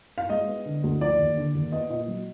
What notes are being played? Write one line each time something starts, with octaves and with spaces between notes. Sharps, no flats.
F5
G#3 D#5
B3
D3
D2
F3 D5
D#2
D3
D#2
B3 D#5
A#2 D#5
F#3